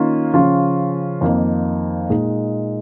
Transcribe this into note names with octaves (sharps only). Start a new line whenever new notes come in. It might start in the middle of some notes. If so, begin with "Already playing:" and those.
Already playing: D#3 A#3 C#4 F4
C#3 F3 C#4 F4
F2 D#3 A#3 D#4
A#2 G#3 D#4